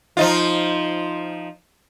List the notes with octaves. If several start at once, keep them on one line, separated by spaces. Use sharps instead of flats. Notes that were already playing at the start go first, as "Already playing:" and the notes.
F3 D#4 F4